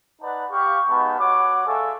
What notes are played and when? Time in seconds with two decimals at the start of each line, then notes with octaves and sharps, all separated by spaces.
0.21 D#4 B4 D5 F#5 A5
0.51 G4 F5 C#6
0.89 G#3 B3 D#4 A5 B5
1.19 F#4 C#5 F#5 D6
1.66 G#3 A4 E5 F5 G#5 C#6